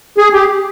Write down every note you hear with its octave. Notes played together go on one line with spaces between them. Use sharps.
G#4
G4